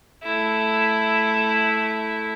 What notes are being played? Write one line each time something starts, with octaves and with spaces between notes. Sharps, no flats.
A3 E4